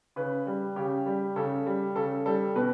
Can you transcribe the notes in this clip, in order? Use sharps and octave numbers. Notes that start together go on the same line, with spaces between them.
C#3 B4
G3
C#3 G4
G3
C#3 A4
G3
C#3 A4
G3 A4
B2 B4